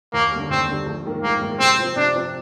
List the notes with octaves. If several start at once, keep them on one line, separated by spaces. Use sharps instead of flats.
D#2 A#3
D3 G3
D#2 C4
D3 G3
A#1
G#2 D#3 A#3
A#1 A#3
G#2 D#3 A#3
C3 C4
F3 C4
C3 D4
F3 C4